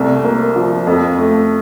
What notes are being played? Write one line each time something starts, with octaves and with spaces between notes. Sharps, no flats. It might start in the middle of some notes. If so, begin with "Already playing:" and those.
Already playing: C2 A3
A#3
F3
F2
A3